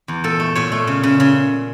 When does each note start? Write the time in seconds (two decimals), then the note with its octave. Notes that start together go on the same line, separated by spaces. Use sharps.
0.08 E2
0.24 A#2 A4
0.40 A3
0.55 A#2 C#5
0.72 A3
0.87 C#3
1.03 C#3
1.20 C#3